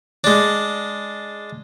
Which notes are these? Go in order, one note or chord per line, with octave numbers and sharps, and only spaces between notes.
G#3 D4